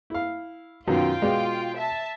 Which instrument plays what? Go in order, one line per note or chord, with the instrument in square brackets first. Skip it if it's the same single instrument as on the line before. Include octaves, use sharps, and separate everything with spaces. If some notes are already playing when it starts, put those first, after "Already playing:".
[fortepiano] E4 F5
[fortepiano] F#2 B2 D#3 [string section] F4 G5
[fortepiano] B2 G#3 D5
[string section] E5 A5